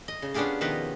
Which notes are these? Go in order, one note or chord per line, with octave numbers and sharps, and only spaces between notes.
D#5
C#3
B3 C#4 D4 F4 G4 G#4
B2 D#3 F3 B3 B4 D#5